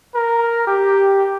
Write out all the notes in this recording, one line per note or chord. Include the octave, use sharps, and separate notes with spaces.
A#4
G4